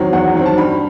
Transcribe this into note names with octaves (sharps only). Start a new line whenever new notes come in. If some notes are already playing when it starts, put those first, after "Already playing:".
Already playing: E2 D#3 F#3 C4
E2 F#5
D#3 F#3 C4
A5
G2 B5